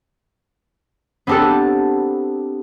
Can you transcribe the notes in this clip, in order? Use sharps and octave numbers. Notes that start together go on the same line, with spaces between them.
B3 C4 D4 G4 A4